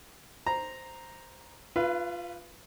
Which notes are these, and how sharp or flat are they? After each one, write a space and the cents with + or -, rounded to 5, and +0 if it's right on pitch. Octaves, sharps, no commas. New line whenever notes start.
C5 +0 A#5 +0
F4 +0 B4 +0 F5 -45